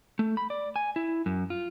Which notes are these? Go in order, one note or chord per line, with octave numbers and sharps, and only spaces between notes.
A3
B5
D5
G#5
E4
F#2
F4